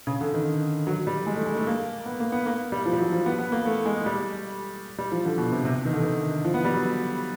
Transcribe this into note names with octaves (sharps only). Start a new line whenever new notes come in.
C#3
D3
D#3
F#3
G3
G#3
A3
G#3
A3
A#3
B3
A#3
B3
A#3
G3
F3
G3
F#3
F3
B3
B3
A#3
A3
G#3
G3
G3
F3
D3
B2
C3
C3
D#3
D3
D#3
F3
B3
G3
F#3